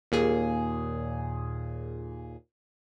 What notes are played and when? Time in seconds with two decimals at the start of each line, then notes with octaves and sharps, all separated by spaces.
0.12 D#2 A#2 G#4